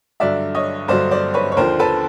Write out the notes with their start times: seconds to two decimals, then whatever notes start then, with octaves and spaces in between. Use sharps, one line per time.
0.20 G2 D3 F#3 D5 E5
0.55 C#5 D#5
0.88 G2 D3 F#3 C5 D5
1.11 C5 D5
1.34 B4 C#5
1.52 C#5
1.57 D#2 D3 F3 A#4 C5
1.79 A4 B4